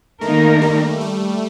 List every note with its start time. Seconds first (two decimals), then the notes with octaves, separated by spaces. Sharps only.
0.21 D#3 A3 A#3 D#4 A#4
0.62 G3
1.01 A3